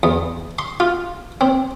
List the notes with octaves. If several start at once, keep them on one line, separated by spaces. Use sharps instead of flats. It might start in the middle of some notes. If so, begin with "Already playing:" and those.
E2
C6
F4
C4